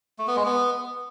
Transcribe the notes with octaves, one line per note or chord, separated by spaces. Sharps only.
A3
B3
G#3
B3